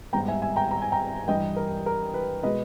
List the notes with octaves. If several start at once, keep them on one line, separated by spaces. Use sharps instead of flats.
G#2 G3 B3 G5 A#5
E5 G#5
E5 G#5
G5 A#5
A#5
G#5
G5 A#5
G2 E3 G3 D#5 G5
A#4
A#4
B4
B2 G#3 B3 B4 D#5